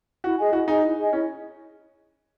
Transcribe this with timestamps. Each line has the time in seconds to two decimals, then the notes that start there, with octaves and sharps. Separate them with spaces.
0.24 E4 F#4
0.38 G#4 D#5 G#5
0.53 E4 F#4
0.68 D#4 G#4 D#5 G#5
0.83 E4
0.98 G#4 D#5 G#5
1.12 C#4 E4